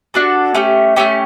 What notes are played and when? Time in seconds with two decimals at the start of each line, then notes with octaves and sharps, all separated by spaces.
0.14 D4 F#4 A4
0.54 A3 C#4 G4
0.96 A3 C#4 G4 E5